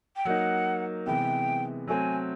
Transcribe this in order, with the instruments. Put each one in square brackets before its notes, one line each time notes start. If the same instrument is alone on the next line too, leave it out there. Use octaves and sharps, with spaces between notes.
[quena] G5
[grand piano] F#3 A#3 D#4 [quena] F#5
[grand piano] C3 E3 G#3 B3 [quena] G5
[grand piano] F#3 A3 C4 [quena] G#5